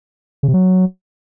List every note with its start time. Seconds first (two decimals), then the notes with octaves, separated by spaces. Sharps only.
0.43 C#3
0.48 C3
0.54 F#3